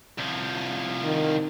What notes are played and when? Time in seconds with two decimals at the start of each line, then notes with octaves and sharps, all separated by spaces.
0.19 C2 F3
1.04 D#3